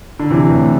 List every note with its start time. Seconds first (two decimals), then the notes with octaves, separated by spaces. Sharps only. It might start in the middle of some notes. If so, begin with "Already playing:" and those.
0.19 D3
0.31 C3 E3
0.50 A2 C3